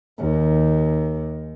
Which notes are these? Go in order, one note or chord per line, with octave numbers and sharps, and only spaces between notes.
D#2